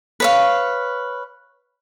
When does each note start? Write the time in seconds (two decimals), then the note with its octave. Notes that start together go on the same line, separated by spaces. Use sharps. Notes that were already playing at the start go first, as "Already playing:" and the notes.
0.20 B4 C#5 F5